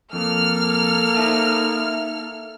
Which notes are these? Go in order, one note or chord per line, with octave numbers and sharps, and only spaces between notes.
F2 A#3 A4 F6
D#4 E5 A5